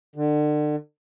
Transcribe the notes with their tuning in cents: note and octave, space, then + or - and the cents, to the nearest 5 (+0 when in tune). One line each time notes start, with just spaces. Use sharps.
D3 +35